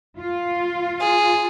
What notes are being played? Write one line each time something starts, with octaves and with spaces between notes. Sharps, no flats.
F4
G#4